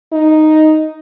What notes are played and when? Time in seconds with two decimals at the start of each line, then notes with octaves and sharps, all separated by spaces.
0.13 D#4